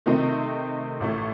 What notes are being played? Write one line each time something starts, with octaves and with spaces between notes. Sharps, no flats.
C3 D#3 A3 C4 D#4
A1 A2 A3